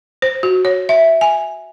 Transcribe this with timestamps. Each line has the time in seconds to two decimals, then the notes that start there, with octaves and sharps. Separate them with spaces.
0.22 C5
0.43 F#4
0.65 C#5
0.89 E5
1.21 G#5